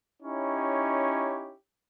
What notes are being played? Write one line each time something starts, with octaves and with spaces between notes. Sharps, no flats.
C#4 D#4 E4 G4 C#5